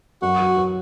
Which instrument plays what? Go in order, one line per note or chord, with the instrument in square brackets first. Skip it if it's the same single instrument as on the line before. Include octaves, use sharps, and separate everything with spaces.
[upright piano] F#2 [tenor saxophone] F#4
[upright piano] F#3
F#3